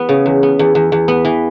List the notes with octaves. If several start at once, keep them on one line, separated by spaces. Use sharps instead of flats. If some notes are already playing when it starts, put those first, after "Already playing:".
Already playing: E2 B3
C#3
E2
B3
E2
E2
E2
B3
E3